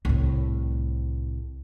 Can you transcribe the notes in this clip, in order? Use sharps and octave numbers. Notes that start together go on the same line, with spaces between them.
C2 A2